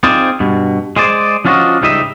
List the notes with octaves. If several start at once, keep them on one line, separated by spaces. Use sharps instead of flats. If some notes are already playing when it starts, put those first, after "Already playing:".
C4 D#4 F4 G#4 C5 D5
G2 B2
G#3 G#4 C5 D5
F3 C#4 D4 F4 F#4 D#5
C#2 G#2 G3 D#4 D#5 E5